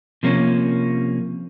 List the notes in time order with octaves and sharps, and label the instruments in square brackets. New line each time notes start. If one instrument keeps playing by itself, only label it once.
[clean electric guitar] C3 F3 A#3 C#4